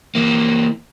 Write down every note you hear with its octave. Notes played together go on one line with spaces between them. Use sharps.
E3 A#3